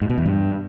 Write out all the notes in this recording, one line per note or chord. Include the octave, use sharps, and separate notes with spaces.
G#2
B2
E2
G2